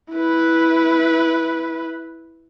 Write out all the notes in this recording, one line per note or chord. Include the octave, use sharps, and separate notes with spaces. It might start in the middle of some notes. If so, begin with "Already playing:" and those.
E4 B4